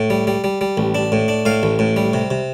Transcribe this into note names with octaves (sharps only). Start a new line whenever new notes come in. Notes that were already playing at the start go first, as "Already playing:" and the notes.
Already playing: A2
G3
G3
G3
G3
A1
D4
A2
D4
A2 F5
A1
A2
G3
C3
C3